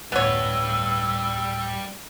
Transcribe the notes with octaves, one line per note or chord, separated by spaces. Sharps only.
D2 A2 G3 B3 B4 C#5 E6